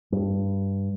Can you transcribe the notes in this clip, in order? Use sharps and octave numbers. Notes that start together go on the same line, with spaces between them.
G2